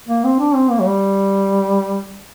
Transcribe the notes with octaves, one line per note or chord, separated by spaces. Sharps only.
A#3
C4
D4
C4
A#3
F#3
G3